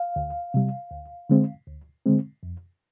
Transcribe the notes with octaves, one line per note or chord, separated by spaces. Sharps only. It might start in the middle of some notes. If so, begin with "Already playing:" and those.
Already playing: F5
D2
C3 G3
D2
D3 G#3 C4
D2
D3 G#3 C4
F2